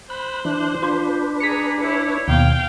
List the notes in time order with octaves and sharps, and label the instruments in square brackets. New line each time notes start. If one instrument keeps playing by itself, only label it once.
[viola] C5 [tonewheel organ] B5 F#6
[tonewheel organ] E3 D4 F#6
[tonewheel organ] D4 B4 [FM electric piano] F4 C6 G6
[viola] G#4 A#5 [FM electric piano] B6 C#7
[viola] E4 C#5
[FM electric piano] D#2 B2 [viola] F5 G5